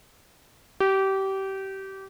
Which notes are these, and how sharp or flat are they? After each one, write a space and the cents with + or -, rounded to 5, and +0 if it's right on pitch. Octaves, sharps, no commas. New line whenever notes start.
G4 -25